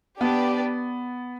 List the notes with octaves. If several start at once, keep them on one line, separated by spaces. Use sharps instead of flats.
B3 D4 G4 B4 D5